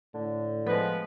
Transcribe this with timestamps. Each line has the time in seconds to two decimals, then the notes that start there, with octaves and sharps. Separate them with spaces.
0.14 A2 D3
0.66 F3 G#3 B3 B4